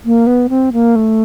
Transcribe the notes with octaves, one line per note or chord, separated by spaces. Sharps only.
A#3
B3
C4
A#3
A3